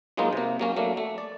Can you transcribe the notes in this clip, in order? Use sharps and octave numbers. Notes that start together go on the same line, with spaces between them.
F#3 G#3 A#3 B3 D#4 F4
C3 A#3
F#3 A#3 C#4
F#3 A3 A#3 D4
A3
D5